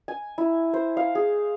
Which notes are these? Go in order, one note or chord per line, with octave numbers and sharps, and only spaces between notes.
G#5
E4
C5
F5
G#4